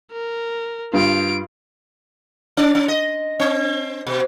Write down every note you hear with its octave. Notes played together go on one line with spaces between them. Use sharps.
A#4
G2 F4 D7
C#4
C#4
D#5
C4
B2